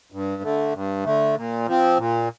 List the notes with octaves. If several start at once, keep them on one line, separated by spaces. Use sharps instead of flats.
G2
D3 A3
G2
D3 A3
A#2
F3 C4
A#2